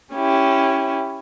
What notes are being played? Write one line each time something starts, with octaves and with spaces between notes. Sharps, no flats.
C#4 E4 G4